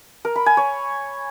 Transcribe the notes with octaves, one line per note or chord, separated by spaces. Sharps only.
A#4
B5
G#5
C#5